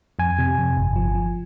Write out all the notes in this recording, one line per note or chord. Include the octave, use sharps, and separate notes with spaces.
F2 G#5
C3
F2
G1
F3
F3